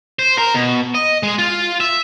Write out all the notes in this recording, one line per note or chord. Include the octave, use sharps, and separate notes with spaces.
C5
A#4
B2
D#5
G#3
F4
E5